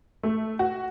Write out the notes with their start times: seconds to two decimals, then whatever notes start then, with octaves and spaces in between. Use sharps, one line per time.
0.23 A3
0.59 F#4